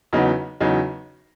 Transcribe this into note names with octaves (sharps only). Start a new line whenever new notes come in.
E2 C#3 F#3 B3 D#4
E2 C#3 F#3 B3 D#4